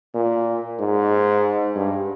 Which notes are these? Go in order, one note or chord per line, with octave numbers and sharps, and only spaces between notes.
A#2
G#2
G2